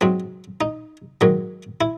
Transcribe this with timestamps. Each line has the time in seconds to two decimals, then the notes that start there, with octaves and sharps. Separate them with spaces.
0.01 G#2 F#3 C4
0.61 D#4
1.21 G#2 D#3 F#3
1.81 E4